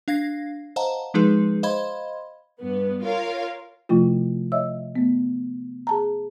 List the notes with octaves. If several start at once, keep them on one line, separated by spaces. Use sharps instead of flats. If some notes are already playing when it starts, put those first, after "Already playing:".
D4 F5 G#6 A#6 C7
C5 D#5 F5 F#5 A5 A#5
F3 G#3 D#4 G#4 B4
C5 D#5 F5 B5 C6 G#6
G2 B3
F4 A#4 C#5 F5
C3 F3 A3 E4 F4
C#5 D#5 E5 E6
A3 B3
G#4 A5 A#5